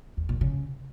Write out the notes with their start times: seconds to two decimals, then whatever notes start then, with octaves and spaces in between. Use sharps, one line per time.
0.17 E2
0.29 A#2
0.41 C#3